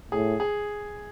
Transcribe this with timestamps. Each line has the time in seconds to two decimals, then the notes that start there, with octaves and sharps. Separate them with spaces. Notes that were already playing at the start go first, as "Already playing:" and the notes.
0.12 A2 G#4
0.40 G#4